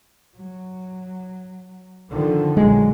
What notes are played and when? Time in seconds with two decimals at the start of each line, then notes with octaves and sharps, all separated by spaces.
0.36 F#3
2.10 D3 D#3 F3
2.57 A#1 F#3 G#3